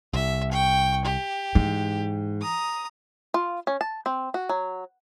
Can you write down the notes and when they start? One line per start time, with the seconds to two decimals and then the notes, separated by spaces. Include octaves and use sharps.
0.13 C2 E5
0.52 G5 C#6
1.05 G4
1.55 G#2 E3
2.42 A#5 D#6
3.34 F4
3.67 C#4
3.81 A5
4.06 C4
4.34 F#4
4.49 F#3